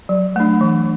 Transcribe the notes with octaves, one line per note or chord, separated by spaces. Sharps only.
F#3
A3 D4
E3